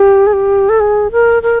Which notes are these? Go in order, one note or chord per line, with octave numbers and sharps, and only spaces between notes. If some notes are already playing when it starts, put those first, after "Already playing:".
Already playing: G4
G#4
G4
A4
G#4
A#4
A#4